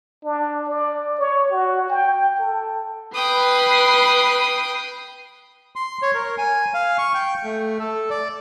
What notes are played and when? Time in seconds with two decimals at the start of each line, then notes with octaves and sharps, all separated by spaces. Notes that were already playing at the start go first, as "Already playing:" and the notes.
0.24 D4
0.68 D5
1.19 C#5
1.51 F#4
1.89 G5
2.39 A4
3.14 B4 G5 D#6 C7
5.76 C6
6.02 C#5
6.14 A#4
6.38 G#5
6.74 F5
6.98 C#6
7.14 G5
7.44 A3
7.80 A4
8.10 D5